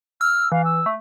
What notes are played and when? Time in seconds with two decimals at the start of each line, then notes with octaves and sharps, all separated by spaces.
0.21 E6 F6
0.52 E3 F5
0.65 E6
0.86 A3